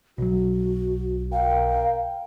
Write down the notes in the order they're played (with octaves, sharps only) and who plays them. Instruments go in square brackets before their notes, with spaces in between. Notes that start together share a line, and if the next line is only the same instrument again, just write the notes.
[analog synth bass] B1 [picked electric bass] B2 F#3 [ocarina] F#4
[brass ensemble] A#4 G5 [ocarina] F5